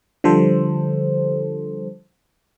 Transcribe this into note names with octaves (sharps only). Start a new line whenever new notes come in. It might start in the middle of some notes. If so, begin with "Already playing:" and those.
D3 F3 G3 A4 C5